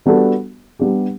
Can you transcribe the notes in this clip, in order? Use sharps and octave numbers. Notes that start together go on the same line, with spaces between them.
G3 B3 D4 F#4 A4
G3 B3 D4 G4